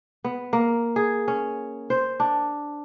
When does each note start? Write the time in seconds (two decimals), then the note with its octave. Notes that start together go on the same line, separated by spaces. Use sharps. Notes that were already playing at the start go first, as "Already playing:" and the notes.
0.24 B3
0.53 A#3
0.96 G#4
1.28 C#4
1.90 C5
2.20 D4